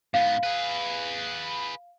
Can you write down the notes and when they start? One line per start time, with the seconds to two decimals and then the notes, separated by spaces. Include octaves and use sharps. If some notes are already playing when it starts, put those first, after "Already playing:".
0.14 G#2 B3 F5
0.43 G#4 B4